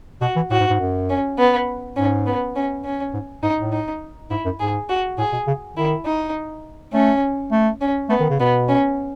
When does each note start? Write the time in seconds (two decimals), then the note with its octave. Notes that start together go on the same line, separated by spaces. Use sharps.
0.21 B2 F#4
0.36 E3
0.51 A2 F#4
0.60 G#2
0.70 G#2
0.80 F#2
1.10 C#4
1.38 B3
1.96 G#2 C#4
2.26 B3
2.55 C#4
2.84 C#4
3.14 G#2
3.43 G#2 D#4
3.57 A2
3.72 D#4
4.30 G#2 E4
4.45 F#2
4.60 G#2 G#4
4.89 F#4
5.18 A2 G#4
5.32 B2
5.47 C#3
5.77 D#3 E4
6.05 D#4
6.93 A3 C#4
7.52 A3
7.81 C#4
8.10 A3 B3
8.20 D#3
8.30 C#3
8.40 B2 B3
8.69 C#4